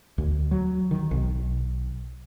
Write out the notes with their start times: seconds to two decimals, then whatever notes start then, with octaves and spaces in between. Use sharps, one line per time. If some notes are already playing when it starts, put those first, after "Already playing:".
0.18 D2
0.51 F#3
0.91 D#3
1.11 B1